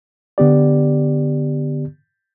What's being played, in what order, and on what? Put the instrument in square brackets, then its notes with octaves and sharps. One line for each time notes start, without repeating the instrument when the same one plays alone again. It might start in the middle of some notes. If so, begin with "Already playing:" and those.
[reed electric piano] D3 B3 G4 D5